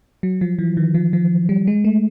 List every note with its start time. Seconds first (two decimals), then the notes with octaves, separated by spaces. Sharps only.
0.23 F#3
0.41 F3
0.59 E3
0.77 D#3
0.94 F3
1.13 F3
1.49 G3
1.67 G#3
1.84 A3